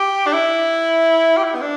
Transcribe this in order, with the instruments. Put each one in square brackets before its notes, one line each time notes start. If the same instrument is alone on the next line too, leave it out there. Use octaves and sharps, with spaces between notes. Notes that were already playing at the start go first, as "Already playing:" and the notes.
Already playing: [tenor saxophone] G4
D4
E4
G4
E4
B3
D4